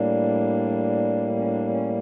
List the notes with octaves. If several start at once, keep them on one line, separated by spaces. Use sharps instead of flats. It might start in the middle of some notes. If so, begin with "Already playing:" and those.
Already playing: A2 G3 A#3 D4
C#4
D4
C#4